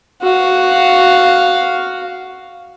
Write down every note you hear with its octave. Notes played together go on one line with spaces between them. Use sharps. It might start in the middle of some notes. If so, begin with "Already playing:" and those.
F#4 F5